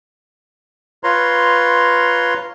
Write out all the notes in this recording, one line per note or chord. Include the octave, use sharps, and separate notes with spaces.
F4 B4 C#5 A#5 C6